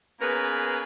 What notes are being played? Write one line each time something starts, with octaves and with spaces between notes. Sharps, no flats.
A#3 B3 C#4 G#4 A#4 B4